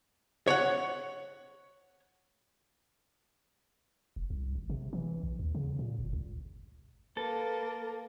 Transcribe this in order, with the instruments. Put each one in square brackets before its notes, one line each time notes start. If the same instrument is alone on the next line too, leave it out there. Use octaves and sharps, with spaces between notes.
[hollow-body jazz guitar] C#5 F#5
[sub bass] E1
C2
G#1
C3
E3
A#1
D#2
C#3
A#2
G1
C#2
[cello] A#3 [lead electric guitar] A4 [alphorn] B4